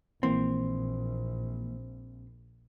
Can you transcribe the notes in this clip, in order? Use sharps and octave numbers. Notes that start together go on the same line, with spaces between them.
A#1 E3 A#3 C4